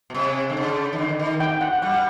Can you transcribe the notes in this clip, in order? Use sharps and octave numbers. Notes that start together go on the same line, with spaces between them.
B2
C3
D3
C#3
D#3
D3
D#3
G5
F#5
G3 F#5